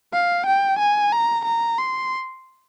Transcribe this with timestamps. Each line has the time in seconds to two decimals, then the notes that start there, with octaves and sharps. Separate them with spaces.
0.14 F5
0.46 G5
0.79 G#5
1.12 A#5
1.45 A#5
1.78 C6